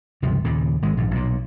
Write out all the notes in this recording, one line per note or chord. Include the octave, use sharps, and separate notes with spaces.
G1 C#2 C3 F3
D#2 A#2 C#3
G#1 G#3
A#1 G#2
B1 A#2